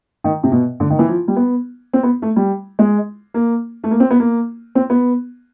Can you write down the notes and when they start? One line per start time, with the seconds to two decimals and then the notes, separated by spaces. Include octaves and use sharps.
0.24 D#3
0.43 C3
0.52 B2
0.80 D3
0.90 D#3
0.99 E3
1.09 F3
1.28 G3
1.36 B3
1.93 C4
2.03 B3
2.22 A3
2.36 G3
2.79 G#3
3.34 A#3
3.84 A3
3.91 A#3
4.00 C4
4.11 B3
4.20 A#3
4.75 C4
4.90 B3